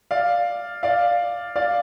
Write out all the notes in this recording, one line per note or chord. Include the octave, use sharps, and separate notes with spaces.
D5 F5
D5 F5
D5 F5